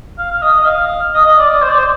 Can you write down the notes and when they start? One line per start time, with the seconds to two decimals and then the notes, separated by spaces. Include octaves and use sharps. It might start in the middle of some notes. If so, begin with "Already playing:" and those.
0.18 F5
0.32 F5
0.42 D#5
0.60 D#5
0.66 F5
1.14 D#5
1.25 D#5
1.38 D5
1.50 D5
1.61 C5
1.69 D5
1.77 C5